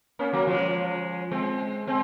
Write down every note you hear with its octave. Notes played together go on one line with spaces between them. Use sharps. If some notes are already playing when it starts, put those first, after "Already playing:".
A#3 C#4
F#3 A#3
F3 G#3
G#3 C4
G#3 C4